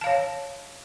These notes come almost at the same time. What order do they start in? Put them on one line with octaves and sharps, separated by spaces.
A5 F5 C#5